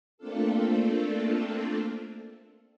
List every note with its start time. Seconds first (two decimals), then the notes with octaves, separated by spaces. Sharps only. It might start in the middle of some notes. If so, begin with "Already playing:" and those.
0.18 A3 A#3 C4 D4 F4 A4